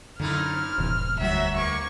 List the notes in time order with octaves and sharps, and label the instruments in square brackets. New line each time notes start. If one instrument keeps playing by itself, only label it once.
[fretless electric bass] F#2 D3 [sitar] A#2 D#4 E4 [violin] F6
[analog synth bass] E1 [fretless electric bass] A2 C3 E3
[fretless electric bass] D2 G3 [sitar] F#3 F#4 [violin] E5
[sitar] A#3 [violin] C#6